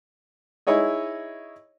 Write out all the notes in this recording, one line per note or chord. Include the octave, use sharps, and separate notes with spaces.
D#4 E4 G#4 C#5 D#5